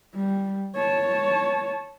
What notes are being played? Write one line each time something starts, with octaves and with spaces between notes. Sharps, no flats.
G3
C#5 A5